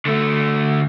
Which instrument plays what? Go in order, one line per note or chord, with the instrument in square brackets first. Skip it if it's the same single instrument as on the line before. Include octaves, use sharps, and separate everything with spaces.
[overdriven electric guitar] D3 A3